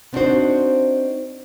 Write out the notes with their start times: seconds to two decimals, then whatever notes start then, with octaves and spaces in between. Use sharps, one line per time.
0.13 B3 C4 D4 D#4 F#4 C5